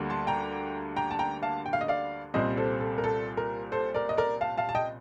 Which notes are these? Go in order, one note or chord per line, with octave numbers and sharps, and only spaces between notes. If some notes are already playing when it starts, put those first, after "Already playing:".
Already playing: D2 D3 G3 A#3
A5 C6
G5 A#5
G5 A#5
A5
G5 A#5
F5 A5
G5
F5
D#5
D5 F5
C2 A#2 G3 C4 C5 D#5
A4 C5
A4
A#4
A4
A#4
A4 C5
A#4 D5
D#5
A#4 D5
F5 A5
F5 A5
A5
D#5 G5